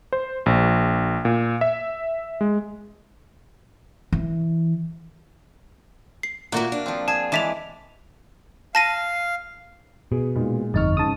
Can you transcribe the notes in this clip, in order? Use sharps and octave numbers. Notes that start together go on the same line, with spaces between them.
C5
A#1
A#2
E5
G#3
E3
C7
A#2 A3 A#3 F#4 A#4
D4
F3 C4
G#4 A5
E3 G#3 D5 A5 B6 F7
F5 A5 A#6 D#7
B2 G#4
A#2 G#3 D#4
G1 F2 D#4 C#6 F6 A6
G#2 C#3 A5 D#6